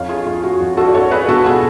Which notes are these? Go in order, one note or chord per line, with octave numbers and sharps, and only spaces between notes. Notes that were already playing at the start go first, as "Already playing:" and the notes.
Already playing: F2 C#5 F5
F4 G#4
F2 F4
F#4
F2
F#4 A4
D5
F2 A4 C#5
G#4 B4
B2 F#4 A4
F4 G#4